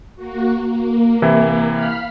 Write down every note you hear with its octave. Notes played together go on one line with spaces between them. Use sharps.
A#3 F#4
A#3
C3 E3 E4
F5 B5 F6